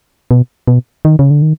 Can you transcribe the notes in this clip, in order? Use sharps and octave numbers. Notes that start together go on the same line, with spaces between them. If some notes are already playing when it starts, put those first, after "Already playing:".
B2
B2
D#3
C#3
D3
D#3